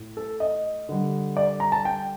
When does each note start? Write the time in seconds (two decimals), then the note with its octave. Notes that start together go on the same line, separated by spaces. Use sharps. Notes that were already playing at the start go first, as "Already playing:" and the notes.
Already playing: A2
0.17 A4
0.40 D#5
0.89 D3 G3
1.37 D5
1.60 A#5
1.72 A5
1.85 G5